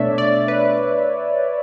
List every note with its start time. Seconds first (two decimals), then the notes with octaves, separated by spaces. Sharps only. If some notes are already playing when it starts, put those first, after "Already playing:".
Already playing: B2 A3 D4 C#5 D5 E5
0.18 D5
0.48 B4